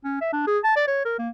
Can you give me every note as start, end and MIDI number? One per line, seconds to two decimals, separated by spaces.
0.04 0.17 61
0.21 0.32 76
0.32 0.45 62
0.47 0.58 68
0.64 0.73 81
0.76 0.84 74
0.87 1.02 73
1.05 1.14 70
1.18 1.29 58